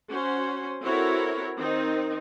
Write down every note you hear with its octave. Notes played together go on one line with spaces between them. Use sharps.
C#4 F#4 C5
C4 E4 F#4 A4 A#4 C#5
D#3 C4 D#4